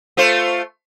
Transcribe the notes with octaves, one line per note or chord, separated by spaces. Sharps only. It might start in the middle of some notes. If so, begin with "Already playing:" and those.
A3 F4 C5